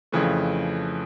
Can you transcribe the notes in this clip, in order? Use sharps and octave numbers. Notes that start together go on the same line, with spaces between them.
F2 C#3 E3 A3